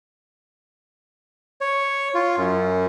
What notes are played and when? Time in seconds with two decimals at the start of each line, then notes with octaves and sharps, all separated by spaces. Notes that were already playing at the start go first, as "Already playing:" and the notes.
1.61 C#5
2.14 F4
2.38 F#2